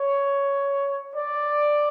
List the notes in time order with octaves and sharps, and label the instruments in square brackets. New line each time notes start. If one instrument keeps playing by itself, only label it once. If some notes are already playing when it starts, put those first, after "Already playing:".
Already playing: [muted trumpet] C#5
D5